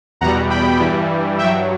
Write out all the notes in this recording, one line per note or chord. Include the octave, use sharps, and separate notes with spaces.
E2 B2 G3 F#5 A#5
G5 B5
G2 E3 G3
G2 F#3 E5 G5